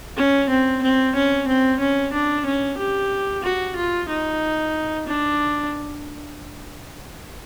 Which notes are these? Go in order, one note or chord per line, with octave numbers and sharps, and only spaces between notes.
C#4
C4
C4
C#4
C4
C#4
D4
C#4
G4
F#4
F4
D#4
D4